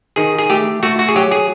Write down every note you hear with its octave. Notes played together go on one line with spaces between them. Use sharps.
D#3 G#4
G#4
A3 G4
A3 F#4
F#4
G#4
F#3 G4
G#4